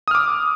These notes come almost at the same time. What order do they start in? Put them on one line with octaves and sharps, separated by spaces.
D#6 F6 D6